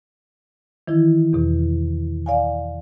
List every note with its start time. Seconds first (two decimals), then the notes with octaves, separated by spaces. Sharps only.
0.88 D#3 E3 E4
1.33 E2 B2
2.26 D5 F5 G#5